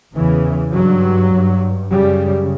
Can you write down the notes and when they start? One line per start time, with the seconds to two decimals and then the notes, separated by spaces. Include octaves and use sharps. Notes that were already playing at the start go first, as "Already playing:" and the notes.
0.14 E2 C#3 E3
0.73 G2 F#3
1.32 G2
1.91 F#2 C#3 G3